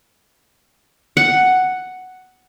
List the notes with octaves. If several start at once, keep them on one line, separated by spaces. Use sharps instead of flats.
F#5